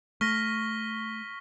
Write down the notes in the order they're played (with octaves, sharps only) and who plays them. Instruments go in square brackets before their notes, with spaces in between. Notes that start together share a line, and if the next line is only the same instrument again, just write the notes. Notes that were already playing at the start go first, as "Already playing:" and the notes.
[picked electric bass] A3 [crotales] C#6 B6 G7 [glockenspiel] F6 A#6